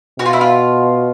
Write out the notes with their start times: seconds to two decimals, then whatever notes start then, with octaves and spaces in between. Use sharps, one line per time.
0.19 B2 F#4
0.25 F4
0.33 E4
0.41 F4